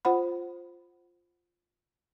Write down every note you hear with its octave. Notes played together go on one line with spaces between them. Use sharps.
F4 C5 F#5 B5